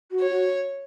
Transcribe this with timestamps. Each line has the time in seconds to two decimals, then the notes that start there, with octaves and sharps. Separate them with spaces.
0.11 F#4
0.20 C#5
0.30 F#4